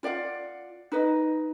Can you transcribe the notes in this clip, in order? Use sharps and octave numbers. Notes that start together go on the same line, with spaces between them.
F4 D5 F5 F#5
D#4 B4 D#5